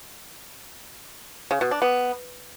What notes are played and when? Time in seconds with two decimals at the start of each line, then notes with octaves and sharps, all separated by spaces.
1.51 C#3
1.61 B2
1.71 D4
1.82 B3